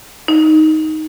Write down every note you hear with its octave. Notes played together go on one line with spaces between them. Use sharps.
D#4